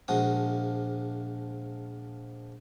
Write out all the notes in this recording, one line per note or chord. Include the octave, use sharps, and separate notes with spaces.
A#1 F3 G#3 F#4 D#6